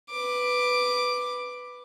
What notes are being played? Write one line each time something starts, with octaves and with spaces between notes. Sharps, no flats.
B4 D6